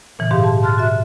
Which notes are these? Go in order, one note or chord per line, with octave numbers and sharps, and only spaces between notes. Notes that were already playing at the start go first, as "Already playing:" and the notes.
A#2 C#3 E3
G#2 G4 F5
A5
A5 C6 F6 F#6 A6
F#4 E5